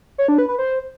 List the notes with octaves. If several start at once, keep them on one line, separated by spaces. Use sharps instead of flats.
C#5
D4
B4
B4
C5